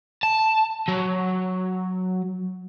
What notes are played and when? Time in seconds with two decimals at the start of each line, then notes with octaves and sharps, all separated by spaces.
0.23 A5
0.89 F#3